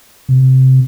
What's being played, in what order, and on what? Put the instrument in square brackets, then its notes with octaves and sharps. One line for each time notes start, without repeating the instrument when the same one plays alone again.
[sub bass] C3